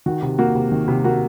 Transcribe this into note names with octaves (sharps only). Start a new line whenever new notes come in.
D#3 F#4
C3
A#3 F#4
C3
D#3
C3
A#3 F#4